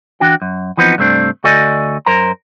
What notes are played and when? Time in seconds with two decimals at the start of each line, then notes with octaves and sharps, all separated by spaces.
0.20 E3 D4 F#4 G5
0.42 F#2
0.77 E3 F3 B3 C4 D#4
0.98 G2 C3 A3 C4 D4
1.44 D2 F#4 A4 D5 D#5 G#5
2.06 F#2 A#4 C5 A#5